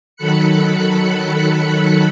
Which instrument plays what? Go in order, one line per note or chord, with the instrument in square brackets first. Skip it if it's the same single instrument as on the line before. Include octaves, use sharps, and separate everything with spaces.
[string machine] D#3 F#3 A4 B5 F#6 C#7